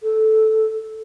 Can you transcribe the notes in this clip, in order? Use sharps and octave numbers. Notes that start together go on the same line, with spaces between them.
A4